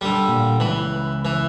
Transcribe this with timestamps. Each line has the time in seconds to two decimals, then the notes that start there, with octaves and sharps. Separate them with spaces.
0.01 D3 G3
0.28 A#2
0.60 C#2 E3 B5
1.25 E3